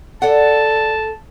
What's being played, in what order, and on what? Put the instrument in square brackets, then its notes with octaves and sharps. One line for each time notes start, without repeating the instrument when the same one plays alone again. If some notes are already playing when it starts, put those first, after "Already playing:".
[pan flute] A4 [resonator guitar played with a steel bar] D5 F#5 [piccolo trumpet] A5